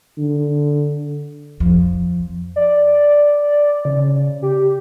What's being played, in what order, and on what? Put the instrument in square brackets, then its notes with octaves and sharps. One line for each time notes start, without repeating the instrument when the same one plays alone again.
[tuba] D3
[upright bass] F2 F3
[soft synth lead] D5
C#3
G4